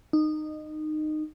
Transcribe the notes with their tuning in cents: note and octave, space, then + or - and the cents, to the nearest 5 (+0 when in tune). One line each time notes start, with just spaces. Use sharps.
D#4 -20